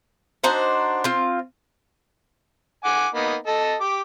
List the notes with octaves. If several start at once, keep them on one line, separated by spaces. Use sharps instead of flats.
D4 D#4 F#4 C5
C4 F4
F#5 G#5 D6
A#3 B3 D#4
A4 D#5 A5
G4 D6